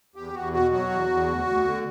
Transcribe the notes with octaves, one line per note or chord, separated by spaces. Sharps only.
E2 G4
E2 F#4
B2 F#4
F#3 F#4
E2
E2
D2
D2
D3